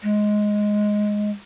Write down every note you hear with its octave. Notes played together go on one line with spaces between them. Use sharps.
G#3